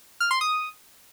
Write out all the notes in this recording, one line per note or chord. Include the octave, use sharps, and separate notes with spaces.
F6
C6
D#6